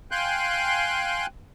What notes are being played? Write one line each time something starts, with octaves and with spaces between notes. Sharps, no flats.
F5 G5 G#5 C6 F#6 G6